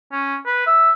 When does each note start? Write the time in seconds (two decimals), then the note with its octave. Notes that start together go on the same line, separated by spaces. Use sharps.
0.12 C#4
0.46 B4
0.67 E5